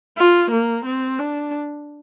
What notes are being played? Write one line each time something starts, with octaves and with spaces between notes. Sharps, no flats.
F4
A#3
C4
D4